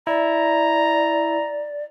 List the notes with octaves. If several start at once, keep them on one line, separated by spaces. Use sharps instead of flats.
E4 D5 A#5